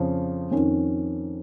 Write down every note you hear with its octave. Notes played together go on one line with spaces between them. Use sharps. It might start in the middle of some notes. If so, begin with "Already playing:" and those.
Already playing: F2 C#3 F3
F2 D#3 C#4